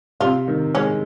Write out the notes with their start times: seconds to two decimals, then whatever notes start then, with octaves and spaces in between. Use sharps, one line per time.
0.20 C3 F4
0.48 D#3
0.75 G#3 C#4